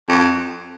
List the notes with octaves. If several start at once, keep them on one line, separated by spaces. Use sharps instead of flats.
F2